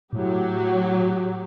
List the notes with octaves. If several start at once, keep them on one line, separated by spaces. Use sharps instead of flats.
A2 F#3 G4